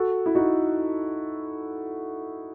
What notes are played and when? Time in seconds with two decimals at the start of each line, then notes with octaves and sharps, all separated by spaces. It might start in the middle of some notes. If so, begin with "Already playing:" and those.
Already playing: F#4 A4
0.26 E4
0.35 D#4 F#4